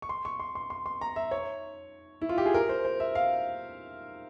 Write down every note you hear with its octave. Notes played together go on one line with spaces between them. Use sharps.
C#6
C6
C#6
C6
C6
C6
C6
A#5
E5
C#5
E4
F4
G4
G#4
A#4
C5
C5
E5
F5